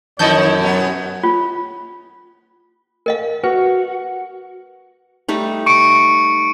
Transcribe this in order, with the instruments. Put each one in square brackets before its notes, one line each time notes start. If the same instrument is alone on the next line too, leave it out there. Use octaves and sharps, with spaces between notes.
[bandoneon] F#2 [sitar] D#3 D#4 E4 [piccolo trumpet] C#5 [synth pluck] D#5 A5 G6
[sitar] B2 F#3 B3
[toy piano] F4
A#4 D#5 F5
[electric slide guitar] F#4 [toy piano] B4
[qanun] G3 A3 D#4
[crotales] C#6 C#7 D7